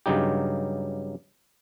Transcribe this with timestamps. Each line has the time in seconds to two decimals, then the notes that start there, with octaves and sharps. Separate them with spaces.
0.06 G2 C#3 F#3 D#4 G4